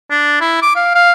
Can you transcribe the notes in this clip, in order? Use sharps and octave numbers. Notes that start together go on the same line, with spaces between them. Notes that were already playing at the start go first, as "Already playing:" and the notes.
D4
E4
D6
F5
F5